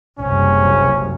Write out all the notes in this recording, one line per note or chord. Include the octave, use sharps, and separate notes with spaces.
F#1 C2 C#4